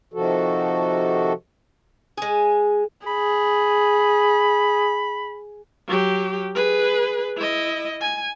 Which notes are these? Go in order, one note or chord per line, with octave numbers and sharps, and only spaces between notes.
C3 D#3 F3 F#4 A4
G#3 G#4
G#4 B5
F#3 G4
G#4 B4
E4 D#5
G#5